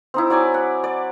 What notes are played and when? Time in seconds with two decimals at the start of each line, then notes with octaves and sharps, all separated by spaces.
0.14 C4 D#4 E4
0.30 F#3 D5 G#5 D6
0.54 F#5
0.84 D5